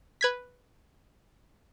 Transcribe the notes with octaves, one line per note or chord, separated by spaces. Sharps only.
B4 G#6 B6